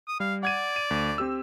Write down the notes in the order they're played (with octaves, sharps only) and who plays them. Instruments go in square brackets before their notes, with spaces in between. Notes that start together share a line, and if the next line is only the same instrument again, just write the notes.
[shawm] D#6
[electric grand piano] G3 [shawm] F5
[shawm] D5 [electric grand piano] F#5 G#6 D#7
[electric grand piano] D#7
D2
C4 G4 E6